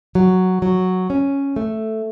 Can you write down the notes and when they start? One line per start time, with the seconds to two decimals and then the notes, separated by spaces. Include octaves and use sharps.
0.15 F#3
0.62 F#3
1.10 C#4
1.56 A3